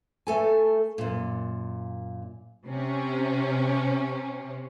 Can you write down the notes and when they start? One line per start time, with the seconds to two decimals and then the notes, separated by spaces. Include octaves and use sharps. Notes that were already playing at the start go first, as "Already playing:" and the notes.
0.27 A3 A4 G#5
0.98 F#2 A#2
2.66 C3 C#4